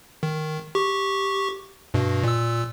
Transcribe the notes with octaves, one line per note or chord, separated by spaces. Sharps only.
D#3
G4 C#6
G2 B2
A#2 E6